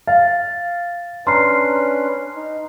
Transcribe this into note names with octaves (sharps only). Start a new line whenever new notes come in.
F5 A6
C#4 D4 B4 A#5 C6 F6 C7
D#4